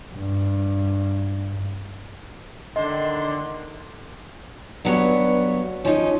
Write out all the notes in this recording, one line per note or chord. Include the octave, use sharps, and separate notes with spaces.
G2
D3 D#3 D#5 C6
G2 F#3 B3 C#5
F3 C#4 D#4